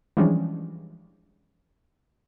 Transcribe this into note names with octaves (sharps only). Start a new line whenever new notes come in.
E3 F3 G3 G#3 C#4 D4